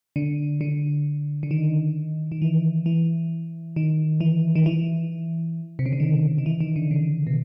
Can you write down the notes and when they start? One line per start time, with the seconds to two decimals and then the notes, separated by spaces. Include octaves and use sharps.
0.16 D3
0.61 D3
1.43 D3
1.51 D#3
2.32 D#3
2.42 E3
2.86 E3
3.76 D#3
4.20 E3
4.55 D#3
4.66 E3
5.79 C3
5.86 C#3
5.93 D3
6.00 D#3
6.38 D#3
6.46 E3
6.61 D#3
6.76 D3
6.91 C#3
7.27 B2